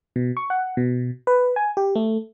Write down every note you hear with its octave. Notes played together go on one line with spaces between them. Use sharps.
B2
C#6
F#5
B2
B4
G#5
G4
A3